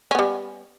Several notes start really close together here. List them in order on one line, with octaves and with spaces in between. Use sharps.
C#4 B3 G3